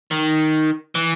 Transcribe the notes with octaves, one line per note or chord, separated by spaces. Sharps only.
D#3
E3